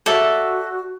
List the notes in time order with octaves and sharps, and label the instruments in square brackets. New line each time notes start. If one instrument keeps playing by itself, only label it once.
[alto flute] F#4 [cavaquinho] A4 D5 E5